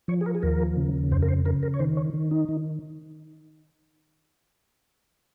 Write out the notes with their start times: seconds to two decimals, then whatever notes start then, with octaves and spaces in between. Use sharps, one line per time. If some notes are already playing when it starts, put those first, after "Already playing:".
0.08 F3 C#5
0.21 G#4
0.26 A#4
0.35 G#4
0.43 D#2 A#4
0.77 C#3
1.11 F2 C5
1.23 A#4
1.29 C5
1.45 C#3 A#4
1.63 A#4
1.74 C#5
1.79 D#3 C5
1.97 C#5
2.14 D#3
2.31 D#4
2.49 D#3